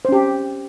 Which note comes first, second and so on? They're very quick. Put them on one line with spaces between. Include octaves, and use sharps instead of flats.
C5 C#4 G4